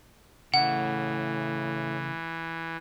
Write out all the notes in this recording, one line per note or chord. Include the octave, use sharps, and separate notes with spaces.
A2 C#3 E3 F#5